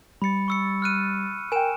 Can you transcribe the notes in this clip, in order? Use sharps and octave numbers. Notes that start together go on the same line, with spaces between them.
G3 B5 A6 C#7
C#6 E6 C#7
F6 F#6 D#7
A#4 G5 G#5 E7